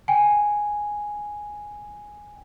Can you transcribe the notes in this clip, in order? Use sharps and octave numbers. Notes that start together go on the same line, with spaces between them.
G5 G#5